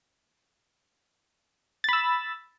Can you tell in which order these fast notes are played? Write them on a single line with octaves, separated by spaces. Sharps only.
A6 B5 E6